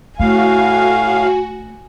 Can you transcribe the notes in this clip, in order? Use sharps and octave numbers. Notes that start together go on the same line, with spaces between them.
A2 A3 F#4 F5 G#5